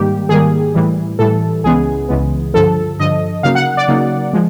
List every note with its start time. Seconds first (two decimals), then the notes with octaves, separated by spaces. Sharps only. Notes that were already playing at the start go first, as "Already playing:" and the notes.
Already playing: G#2 D#3 G3 A#3 G4
0.29 G#2 D#3 G3 A#3 G#4
0.74 A2 E3 G3
1.19 A2 E3 G3 A4
1.64 C#2 C#3 E3 G#3 B3 G#4
2.08 C#2 C#3 E3 G#3 B3
2.54 G2 D3 F3 A4
2.99 G2 D3 F3 D#5
3.43 C#3 F#3 A#3 D#4 F5
3.55 F#5
3.77 D5
3.88 C#3 F#3 A#3 D#4
4.33 F3 G#3